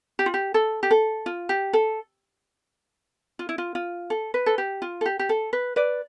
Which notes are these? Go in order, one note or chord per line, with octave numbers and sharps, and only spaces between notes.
G4
F4
G4
A4
G4
A4
F4
G4
A4
F4
E4
F4
F4
A4
B4
A4
G4
F4
A4
G4
G4
A4
B4
B4 D5